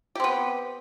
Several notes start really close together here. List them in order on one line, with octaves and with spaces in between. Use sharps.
G4 C4 B3